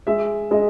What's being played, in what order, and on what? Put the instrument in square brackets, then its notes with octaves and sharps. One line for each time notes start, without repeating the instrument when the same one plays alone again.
[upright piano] G#3 E5
G#3 D#5